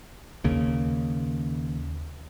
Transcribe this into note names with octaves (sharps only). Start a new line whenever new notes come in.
D#2 C#3 A#3